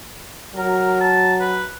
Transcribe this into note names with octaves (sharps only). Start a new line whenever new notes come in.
F#3 A#4
A5
B4